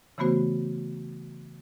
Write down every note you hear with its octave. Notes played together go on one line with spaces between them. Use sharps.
C#3 E3 A3 B3 F#4 C5